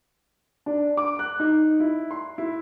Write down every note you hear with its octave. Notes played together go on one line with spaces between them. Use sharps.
D4
D6
F#6
D#4
E4
C6
E4